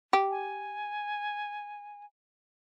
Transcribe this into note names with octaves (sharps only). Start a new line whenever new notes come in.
G4
G#5